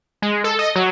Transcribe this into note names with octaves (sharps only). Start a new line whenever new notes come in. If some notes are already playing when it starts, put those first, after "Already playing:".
G#3
A4
D#5
F#3